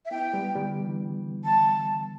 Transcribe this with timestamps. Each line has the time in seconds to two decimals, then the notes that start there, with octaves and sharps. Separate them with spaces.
0.05 E5
0.11 B3 E4 G5
0.33 G3 B3
0.55 D3 G3
0.78 E3
1.44 A5